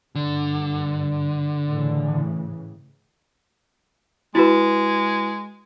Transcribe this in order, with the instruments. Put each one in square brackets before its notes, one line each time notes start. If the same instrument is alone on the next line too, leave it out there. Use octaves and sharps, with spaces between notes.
[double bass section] G2 [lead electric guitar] D3
[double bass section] A2 C#3 E3
[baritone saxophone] G#3 [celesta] E4 F#4 B4